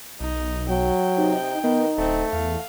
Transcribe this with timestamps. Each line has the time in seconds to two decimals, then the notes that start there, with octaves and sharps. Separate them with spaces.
0.20 B1 D#4
0.69 F#3 G5
1.17 C3 D#4
1.64 D#3 B3 D#4
1.98 D1 A3 C4
2.33 E2 F5